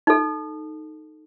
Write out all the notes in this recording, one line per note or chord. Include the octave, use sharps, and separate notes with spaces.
D#4 A4